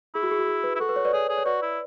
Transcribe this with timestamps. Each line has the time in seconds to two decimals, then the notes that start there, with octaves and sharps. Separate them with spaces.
0.15 E4 G#4
0.23 F#4
0.31 G#4
0.39 F#4
0.47 G#4
0.64 B4
0.76 E4
0.80 F#4 A4
0.89 B4
0.96 C#5
1.05 B4 D5
1.13 G#4 C#5
1.29 G#4
1.38 C#5
1.45 F#4 B4 D5
1.62 E4